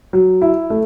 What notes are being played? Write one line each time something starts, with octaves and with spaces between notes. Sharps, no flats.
F#3
E4
A3